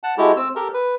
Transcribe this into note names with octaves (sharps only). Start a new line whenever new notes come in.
F#5 A5
G#3 E4 F#4 G4 A4
C4 E6
G4 A4 A#4
B4